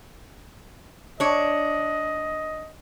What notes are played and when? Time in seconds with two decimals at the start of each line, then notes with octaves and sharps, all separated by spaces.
1.20 D4 C#5 D#5